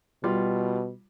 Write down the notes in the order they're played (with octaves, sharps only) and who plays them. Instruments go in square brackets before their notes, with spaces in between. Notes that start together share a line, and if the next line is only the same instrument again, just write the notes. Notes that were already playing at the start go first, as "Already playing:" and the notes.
[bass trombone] B2 [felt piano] G3 F4